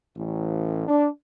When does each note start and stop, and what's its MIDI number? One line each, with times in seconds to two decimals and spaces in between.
0.16 0.88 33
0.88 1.09 62